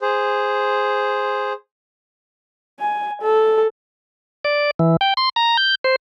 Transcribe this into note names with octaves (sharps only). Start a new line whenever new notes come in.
G#4 C5
G#5
A4
D5
E3
G5
C6
A#5
G6
C5